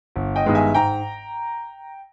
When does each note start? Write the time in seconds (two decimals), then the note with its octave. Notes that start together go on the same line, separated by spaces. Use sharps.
0.16 G1
0.36 D#5 G5
0.45 G2 D#3 G#3 B3
0.55 E5 G#5
0.74 G#2 G5 A#5